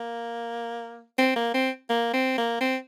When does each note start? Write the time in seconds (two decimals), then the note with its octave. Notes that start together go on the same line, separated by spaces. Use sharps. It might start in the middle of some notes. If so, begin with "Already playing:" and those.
Already playing: A#3
1.19 C4
1.36 A#3
1.54 C4
1.90 A#3
2.14 C4
2.38 A#3
2.61 C4